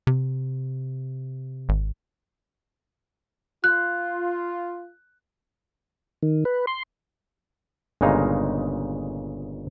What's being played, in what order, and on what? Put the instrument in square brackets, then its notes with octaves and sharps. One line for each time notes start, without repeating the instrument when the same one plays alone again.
[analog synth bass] C3
G#1
[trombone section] F4 [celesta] F#6
[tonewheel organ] D#3
B4
C6
[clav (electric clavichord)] G1 A#2 C#3 G#3 D#4 F5